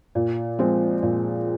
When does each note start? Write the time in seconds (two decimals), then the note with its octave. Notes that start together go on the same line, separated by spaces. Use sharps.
0.15 A#2
0.59 F3 G#3 C4
1.03 A#2